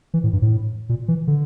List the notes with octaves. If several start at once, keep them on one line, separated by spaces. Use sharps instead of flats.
E3
A2
G2
A2
A#2
E3
D3